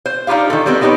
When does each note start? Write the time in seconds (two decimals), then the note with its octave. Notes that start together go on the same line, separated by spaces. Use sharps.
0.06 C5
0.27 D4 D#4 F4 G4 F5
0.50 D#3 A4
0.66 G3 B3 C4
0.81 D4 D#4 G4 A#4 B4 C#5